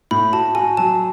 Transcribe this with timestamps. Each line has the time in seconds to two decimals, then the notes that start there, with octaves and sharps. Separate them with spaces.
0.11 A2 B5
0.33 F#4 A5
0.55 F#4 G#5
0.77 F#3 A5